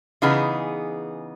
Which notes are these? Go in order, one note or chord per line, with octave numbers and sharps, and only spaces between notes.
C#3 E3 B3 D#4 G#4